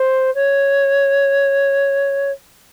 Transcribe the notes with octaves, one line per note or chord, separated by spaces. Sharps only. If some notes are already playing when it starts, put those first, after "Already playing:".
Already playing: C5
C#5